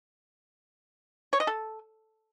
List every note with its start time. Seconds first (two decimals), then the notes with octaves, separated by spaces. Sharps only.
1.33 C#5
1.40 D#5
1.47 A4